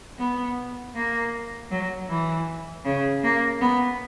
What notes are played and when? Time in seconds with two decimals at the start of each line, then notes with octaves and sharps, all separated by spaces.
0.19 B3
0.95 A#3
1.71 F#3
2.10 E3
2.85 C#3
3.23 A#3
3.61 B3